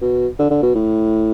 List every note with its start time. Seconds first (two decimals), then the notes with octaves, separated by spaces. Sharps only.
0.01 B2
0.39 D3
0.50 D3
0.62 B2
0.75 A2